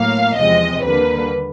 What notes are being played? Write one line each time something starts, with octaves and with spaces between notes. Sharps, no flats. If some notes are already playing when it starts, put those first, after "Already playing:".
Already playing: A2 F#3 A#3 F5
E2 C3 F3 G#3 C4 D#5
D#2 D3 G3 A#3 B4